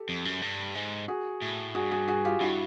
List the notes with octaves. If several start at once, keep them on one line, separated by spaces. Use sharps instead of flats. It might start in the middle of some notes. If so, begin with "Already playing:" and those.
Already playing: G4 A4
F2
F#2
G2
G#2
F#4 G#4
A2
G2 F#4 G#4
F#4 G#4
F#4 G#4
F4 G4
G2 E4 F#4